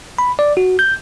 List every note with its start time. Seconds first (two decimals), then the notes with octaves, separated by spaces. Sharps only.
0.19 B5
0.39 D5
0.57 F#4
0.79 G6